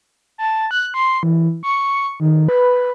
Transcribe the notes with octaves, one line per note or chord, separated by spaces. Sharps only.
A5
F#6
C6
E3
C#6
D#3
B4